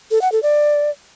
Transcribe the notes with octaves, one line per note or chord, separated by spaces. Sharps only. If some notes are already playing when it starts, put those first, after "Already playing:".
A4
F#5
A4
D5